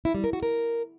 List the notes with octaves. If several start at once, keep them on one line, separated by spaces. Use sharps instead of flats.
E4
G3
A#4
F#4
A#4